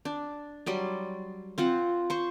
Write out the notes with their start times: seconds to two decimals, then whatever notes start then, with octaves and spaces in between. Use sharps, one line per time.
0.05 D4
0.66 F#3 G3 D5 C6
1.58 C4 F4 F#5
2.10 C5 C#6